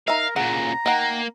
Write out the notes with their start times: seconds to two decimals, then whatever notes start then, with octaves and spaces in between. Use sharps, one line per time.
0.08 D#4 A#4 E5 F5
0.36 A#2 C#3 F#5 A#5
0.86 D#3 A#3 F#5